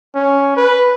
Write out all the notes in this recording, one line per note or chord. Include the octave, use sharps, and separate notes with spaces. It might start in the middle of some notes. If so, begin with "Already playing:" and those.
C#4
B4